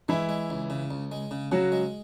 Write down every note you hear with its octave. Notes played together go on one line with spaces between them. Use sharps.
E3 G#3 E4
G#3
C#2
C#3
C#2
G#3
C#3
C#3 F#3 F#4
G#3